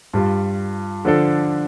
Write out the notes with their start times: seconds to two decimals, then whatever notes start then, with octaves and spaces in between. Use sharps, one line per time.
0.13 G2 G3 F4
1.05 D3 F3 D4 A4